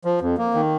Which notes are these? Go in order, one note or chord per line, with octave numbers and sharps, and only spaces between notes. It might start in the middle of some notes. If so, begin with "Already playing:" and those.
F3
F2
A#3
D#3